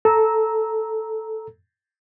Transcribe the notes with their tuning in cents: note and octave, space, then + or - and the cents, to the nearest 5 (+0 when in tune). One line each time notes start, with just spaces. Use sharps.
A4 +0 A#5 +0 E6 -15